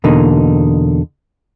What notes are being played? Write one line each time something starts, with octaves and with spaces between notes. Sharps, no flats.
E2 B2 D3 A#3 D#4